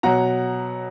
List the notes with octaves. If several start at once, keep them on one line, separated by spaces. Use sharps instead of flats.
B2 F#3 F#5 A#5